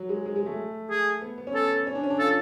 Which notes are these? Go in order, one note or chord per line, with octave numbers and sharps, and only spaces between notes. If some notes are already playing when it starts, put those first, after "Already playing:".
Already playing: F#3
G#3
G#3
G#3
A3
G#4
B3
B3
C#4
A4
C#4
D4
C#4
D4
F4 A4